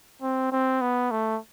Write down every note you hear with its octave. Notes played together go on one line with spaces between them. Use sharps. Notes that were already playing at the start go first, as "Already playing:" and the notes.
C4
C4
B3
A3